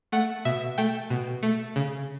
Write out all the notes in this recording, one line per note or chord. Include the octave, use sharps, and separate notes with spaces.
A3 F#5
B2 E5
A3 G5
B2
A3
C#3